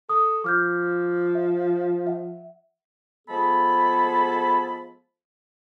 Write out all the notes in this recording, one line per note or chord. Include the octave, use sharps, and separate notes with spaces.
A4 D#6
F3 D6 F6 G6
E5
E5 F#5
F3 G#3 B3 G#4 A4 B5